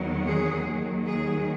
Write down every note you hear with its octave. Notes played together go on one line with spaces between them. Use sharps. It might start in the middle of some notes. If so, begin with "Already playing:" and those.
Already playing: E2 D#3 F#3
G#4
D#2 D#3 F#3
G#4